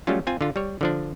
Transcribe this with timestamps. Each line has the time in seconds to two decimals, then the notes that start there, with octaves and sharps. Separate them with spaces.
0.07 F#3 G3 A3 C#4 F4
0.27 C4 F4 G#5
0.41 D3 F4
0.56 G3 C#5
0.81 D3 F3 D4